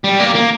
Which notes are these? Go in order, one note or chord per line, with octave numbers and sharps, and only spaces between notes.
G3
A#3
A#3